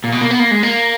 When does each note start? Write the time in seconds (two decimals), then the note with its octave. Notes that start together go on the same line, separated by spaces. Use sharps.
0.04 A#2
0.12 B2
0.21 A#3
0.30 B3
0.39 A#3
0.51 G#3
0.63 A#3